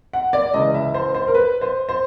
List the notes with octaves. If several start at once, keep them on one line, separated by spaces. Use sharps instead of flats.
F#5
D5
C#2 C#3 E3 D#5
E5
C5
C5
A#4
B4
C5
C5